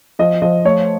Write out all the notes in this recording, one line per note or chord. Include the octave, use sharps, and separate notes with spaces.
F3 D#5
F3 D#5
A3 C#5